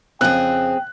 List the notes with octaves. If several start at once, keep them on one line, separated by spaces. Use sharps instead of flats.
F2 C#3 C4 G#4 G5 F#6